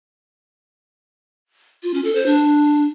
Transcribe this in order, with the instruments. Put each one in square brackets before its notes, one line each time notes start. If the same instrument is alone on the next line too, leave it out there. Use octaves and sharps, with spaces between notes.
[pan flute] F4
C#4
A4
C5
D4